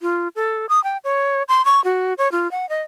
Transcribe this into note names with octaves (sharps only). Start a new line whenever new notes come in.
F4
A4
D#6
G5
C#5
C6
C#6
F#4
C#5
F4
F#5
D#5